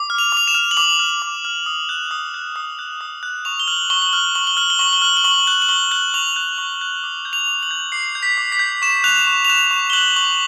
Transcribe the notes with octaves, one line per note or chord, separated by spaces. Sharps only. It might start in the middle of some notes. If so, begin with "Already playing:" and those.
Already playing: D6
F6
F7
D6 F7
E7
F6
F#7
D6 F7
F6
D6
F6
D#6
F#6
D#6
F#6
D#6
F#6
D#6
F#6
C#6 F7
G7
F6 F#7
C#6 G7
F#7
F6 G7
C#6 F#7
G7
F6 F#7
G7
C#6 F#7
G7
F6 F#7
G7
C#6 F#7
F#6 F#7
F#7
C#6 G7
F#6 F#7
C#6 F7
F#6
C#6
F#6
D6
G6
F7
D6
F#7
G6
D6 C7
G6
B6
D6
B6
G6
C#6 E7
F#6 F7
C#6 F7
F7
F#6 E7
C#6
G7
F#6 F#7
C#6 F#7